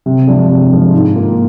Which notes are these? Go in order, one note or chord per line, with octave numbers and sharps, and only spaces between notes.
C3
F3 G#3 D4
C3
F3 G#3 D4
G#2
D#3 A#3 F4